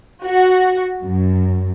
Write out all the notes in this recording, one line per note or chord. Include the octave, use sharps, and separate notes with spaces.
F#4
F#2